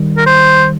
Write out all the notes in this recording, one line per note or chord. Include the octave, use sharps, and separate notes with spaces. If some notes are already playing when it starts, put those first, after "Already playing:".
Already playing: D#3 G3
A#4
C5